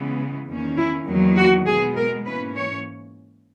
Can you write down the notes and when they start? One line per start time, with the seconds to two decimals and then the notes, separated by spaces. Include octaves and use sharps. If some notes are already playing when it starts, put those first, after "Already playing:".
Already playing: C#3 E3 G#3 B3
0.47 E2 D#3 A#3 C#4
0.77 E4
1.07 E2 D#3 F#3 A#3
1.36 F#4
1.67 B2 G#3 B3 G#4
1.96 A#4
2.25 G#2 E3 A#3 C#4 B4
2.56 C#5